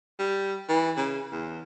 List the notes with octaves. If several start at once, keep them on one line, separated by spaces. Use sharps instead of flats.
G3
E3
C#3
E2